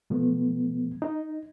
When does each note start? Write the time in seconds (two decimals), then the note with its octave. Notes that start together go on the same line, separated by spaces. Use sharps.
0.10 B2 F3 A3 B3
1.02 D#4